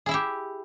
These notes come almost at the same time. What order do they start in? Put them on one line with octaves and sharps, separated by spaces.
G#4 E4 E5 G4